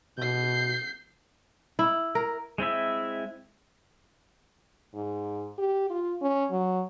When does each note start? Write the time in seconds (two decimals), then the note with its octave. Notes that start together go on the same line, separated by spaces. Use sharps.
0.18 B2 G6 C7
1.79 E4
2.15 A#4
2.58 G#3 C4 E4 E5
4.95 G#2
5.58 G4
5.90 F4
6.21 C#4
6.51 F#3